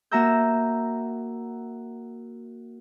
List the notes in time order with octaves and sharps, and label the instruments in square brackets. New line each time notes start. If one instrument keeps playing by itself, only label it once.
[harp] A#3 F#4 E5 A#5 E6 G6